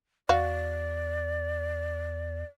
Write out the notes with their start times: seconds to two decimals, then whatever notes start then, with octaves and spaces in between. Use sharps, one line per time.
0.29 E2 F#4 D5 F5